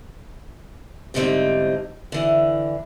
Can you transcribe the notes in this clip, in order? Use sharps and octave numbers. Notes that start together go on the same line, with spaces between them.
E2 G#2 D3 G3 C4 D#4
D3 E3